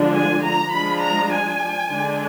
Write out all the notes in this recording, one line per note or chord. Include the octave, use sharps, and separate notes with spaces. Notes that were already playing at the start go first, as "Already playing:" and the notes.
Already playing: D3 F3 G#3 D4
G#5
A#5
F3 G#3 D4 B5
A#5
G#5
D3 G#3 D4